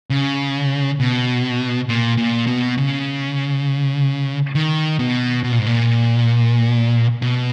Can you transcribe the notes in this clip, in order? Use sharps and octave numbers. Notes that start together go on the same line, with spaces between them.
C#3
B2
A#2
A#2
B2
C#3
D#3
B2
B2
A#2
G#2
A#2
B2